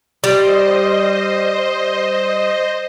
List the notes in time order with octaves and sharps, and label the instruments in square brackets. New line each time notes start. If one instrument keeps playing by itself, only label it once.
[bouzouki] G3 [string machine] C5 D#5